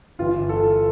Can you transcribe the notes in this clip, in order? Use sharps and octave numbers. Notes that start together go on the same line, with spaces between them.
G1 G2 E3 F4
A4